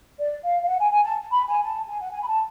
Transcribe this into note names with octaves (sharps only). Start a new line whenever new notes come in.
D5
F5
F5
F#5
G#5
G#5
A5
B5
G#5
A5
G#5
F#5
G#5
B5
A5